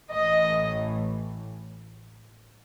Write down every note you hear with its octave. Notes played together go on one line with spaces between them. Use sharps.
A1 A2 E3 D#5